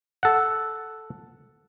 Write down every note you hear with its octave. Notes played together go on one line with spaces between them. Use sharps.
A4 F#5